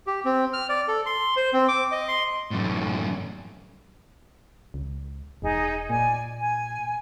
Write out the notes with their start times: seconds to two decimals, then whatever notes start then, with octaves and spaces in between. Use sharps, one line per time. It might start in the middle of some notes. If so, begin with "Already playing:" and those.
0.07 G4
0.25 C4
0.53 F6
0.69 D5
0.88 A4
1.06 C6
1.36 C5
1.53 C4
1.68 D6
1.92 D#5
2.08 C6
2.51 F#2 A2
4.74 C#2
5.42 E1 D#4 G#4 D#5
5.90 A#2 D5 G#5
6.39 G#5